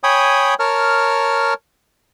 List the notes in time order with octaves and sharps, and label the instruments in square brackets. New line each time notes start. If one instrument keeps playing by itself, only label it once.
[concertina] C#5 G5 G#5 B5 D#6
A#4 C#5 A5 F6